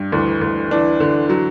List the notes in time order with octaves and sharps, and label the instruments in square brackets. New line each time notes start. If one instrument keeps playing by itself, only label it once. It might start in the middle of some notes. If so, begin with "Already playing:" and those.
Already playing: [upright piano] G2 [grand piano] G3
[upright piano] D2 [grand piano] E3
[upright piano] D2
[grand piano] E3 [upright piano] D4
[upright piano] D3
F#3